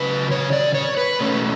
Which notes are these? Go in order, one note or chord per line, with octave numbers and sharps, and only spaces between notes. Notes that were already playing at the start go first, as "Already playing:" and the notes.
Already playing: C#3 F#3 C#4 B4
C#5
D5
C#5
B4
B2 A3 C#4